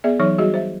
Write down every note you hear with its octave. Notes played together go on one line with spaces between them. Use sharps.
B3 G#4 D5 E5
E3 F#3 D#4 C#5 C#6
G3 F#4 G#4 D#5
C5 E5